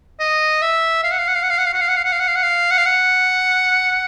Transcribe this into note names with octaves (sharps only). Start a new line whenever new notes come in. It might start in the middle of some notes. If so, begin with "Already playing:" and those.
D#5
E5
F5
F#5
F5
F#5
F5
F#5
F5
F#5
F5
F#5
F5
F#5
F5
F#5
F5
F#5
F5
F#5
F5
F#5
F5
F#5